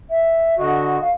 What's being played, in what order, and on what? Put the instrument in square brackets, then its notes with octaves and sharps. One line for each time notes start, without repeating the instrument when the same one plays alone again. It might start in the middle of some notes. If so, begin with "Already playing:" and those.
[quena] E5
[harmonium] D3 F#4 [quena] D#5
[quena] F5